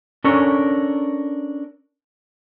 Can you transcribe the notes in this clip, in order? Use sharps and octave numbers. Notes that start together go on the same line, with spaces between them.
C#4 D4 A4 A#4 C#5